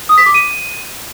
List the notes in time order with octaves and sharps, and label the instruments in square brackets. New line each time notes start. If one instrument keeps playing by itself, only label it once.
[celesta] D#6
B6
D6
D#7